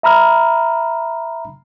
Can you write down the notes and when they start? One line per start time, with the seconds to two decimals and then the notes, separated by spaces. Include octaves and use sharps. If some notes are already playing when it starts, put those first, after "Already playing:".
0.03 E5 A#5 B5 F6